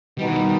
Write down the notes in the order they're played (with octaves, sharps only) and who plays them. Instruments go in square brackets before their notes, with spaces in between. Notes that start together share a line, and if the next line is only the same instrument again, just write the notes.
[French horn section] B2 D#3 [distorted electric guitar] G3
[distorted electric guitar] E3
G3